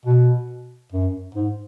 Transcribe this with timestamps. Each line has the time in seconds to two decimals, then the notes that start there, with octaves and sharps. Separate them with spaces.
0.06 B2
0.93 F#2
1.35 G#2